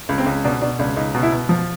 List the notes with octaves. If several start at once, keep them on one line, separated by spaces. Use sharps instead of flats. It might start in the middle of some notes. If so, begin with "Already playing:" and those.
C#2
C4
C#2
B2 D4
B2 D4
C#2 D4
C#2 D#4
B2
E4
B2
F3